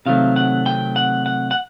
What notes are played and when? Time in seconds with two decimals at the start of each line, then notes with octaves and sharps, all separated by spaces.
0.06 C3 D#3 F#3 A3 C4 F5
0.36 F#5
0.66 G5
0.96 F#5
1.26 F#5
1.51 F#5